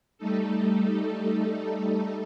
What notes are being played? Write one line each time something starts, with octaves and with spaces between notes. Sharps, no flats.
G3 A3 D#4 A4